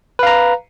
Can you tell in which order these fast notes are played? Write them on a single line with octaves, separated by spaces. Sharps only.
B4 F5 A#5